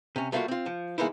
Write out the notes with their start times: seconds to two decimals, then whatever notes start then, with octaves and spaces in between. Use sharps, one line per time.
0.16 C3 C#4
0.32 G3 A3 A#3 C4 F4 F#4
0.48 C4 F4
0.66 F3
0.98 E3 G#3 A#3 B3 D#4 E4